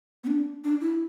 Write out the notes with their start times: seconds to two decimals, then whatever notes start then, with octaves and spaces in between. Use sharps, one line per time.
0.24 B3
0.27 D4
0.64 D4
0.81 E4